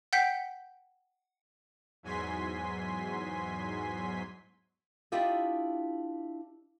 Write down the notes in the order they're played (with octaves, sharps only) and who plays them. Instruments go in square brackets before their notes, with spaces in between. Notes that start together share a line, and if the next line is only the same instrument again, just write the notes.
[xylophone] F#5 G5 G6 B6 C7
[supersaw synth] E2 G#2 F#3 G#5 C6 B6
[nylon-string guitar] D4 E4 F4 G4 D#5 E5